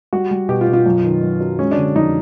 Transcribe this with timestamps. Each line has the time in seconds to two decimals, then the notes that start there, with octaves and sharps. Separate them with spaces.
0.13 G3 F#4
0.31 G3
0.49 B2 G4
0.61 F4
0.68 B2
0.73 F4
0.86 F#2
1.04 D#3
1.23 F#2
1.41 F#3
1.59 G#3 C#4
1.71 D4
1.77 D3
1.95 F2 D#4